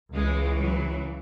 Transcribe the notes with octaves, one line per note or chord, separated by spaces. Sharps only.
C#2 C#3 E3 G#3
F#3